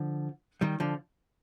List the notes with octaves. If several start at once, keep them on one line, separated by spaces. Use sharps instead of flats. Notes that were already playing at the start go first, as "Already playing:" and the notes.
Already playing: D3 F3
D#3 G3
D3 F3